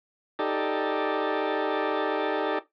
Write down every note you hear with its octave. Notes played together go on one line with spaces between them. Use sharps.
D#4 G4 A4 D5